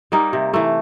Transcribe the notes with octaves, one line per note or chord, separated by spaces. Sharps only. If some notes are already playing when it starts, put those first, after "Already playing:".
G3 A#3 D#4
C3
E3 A3